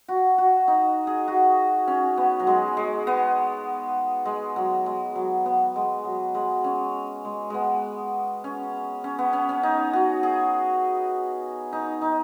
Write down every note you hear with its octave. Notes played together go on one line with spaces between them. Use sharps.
F#4
F#4
D#4
G#4
F#4
C#4
B3
F#3
G#3
G#3
B3
G#3
F#3
G#3
F#3
B3
G#3
F#3
G#3
C#4
G#3
G#3 B3
C#4
C#4
B3
C#4
C#4
D#4
F#4
G#4
D#4
D#4